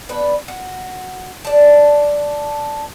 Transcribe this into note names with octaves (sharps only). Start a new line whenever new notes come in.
B3 D4 B4
F#4
D4 A5